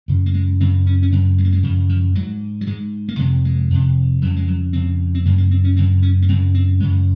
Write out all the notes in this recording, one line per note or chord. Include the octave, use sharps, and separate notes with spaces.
F#2 C#3
A#3
G#3
F#2 C#3 C4
C#4
C#4
F#2 C#3 C4
G#3
A#3
G#3
F#2 C#3 F3
F3
G#2 F#3
F#3
G#2 G#3
A#3
F2 C3 G#3
G#3
F2 C3
F2 C#3 F#3
G#3
F#3
F2 C#3 C4
C4
F#2 C#3 A#3
A#3
C4
C#4
F#2 C#3 C4
C#4
A#3
F#2 C#3 C4
C4
F#2 C#3 G#3